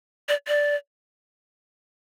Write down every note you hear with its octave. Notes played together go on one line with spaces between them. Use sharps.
D5
D5